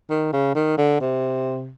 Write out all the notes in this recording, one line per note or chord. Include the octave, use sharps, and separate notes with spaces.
D#3
C#3
D#3
D3
C3